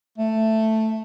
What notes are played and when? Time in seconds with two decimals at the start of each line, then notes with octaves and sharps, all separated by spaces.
0.18 A3